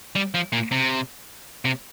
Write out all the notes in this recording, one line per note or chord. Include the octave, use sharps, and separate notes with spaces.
G3
F3
A#2
C3
C3